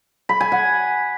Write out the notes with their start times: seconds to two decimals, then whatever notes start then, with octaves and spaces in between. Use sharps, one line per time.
0.29 B5
0.40 G#5
0.52 F#5